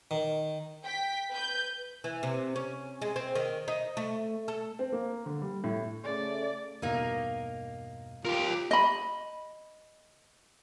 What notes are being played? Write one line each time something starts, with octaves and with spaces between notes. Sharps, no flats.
D#3
G5 B6
B4 G6
E3
C3
C#4
G#3
C4
D#3
D#4
A3
A4
C4
A#3
D3
G3
A2
C#3 A3 D5
E2 G2 B2 A#3 D#4
F4 G4 A#4
D#5 B5